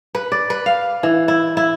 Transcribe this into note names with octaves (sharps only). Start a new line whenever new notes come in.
B4
D5
B4
F5
E3
E4
E4